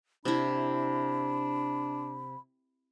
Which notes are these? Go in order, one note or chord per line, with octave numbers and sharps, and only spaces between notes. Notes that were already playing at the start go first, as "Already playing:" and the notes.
C3 D4 E4 B5